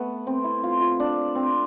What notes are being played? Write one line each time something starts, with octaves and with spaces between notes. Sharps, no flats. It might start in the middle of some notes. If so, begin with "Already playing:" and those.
Already playing: A3 B3
C4
E4
F4
F4
D4
C4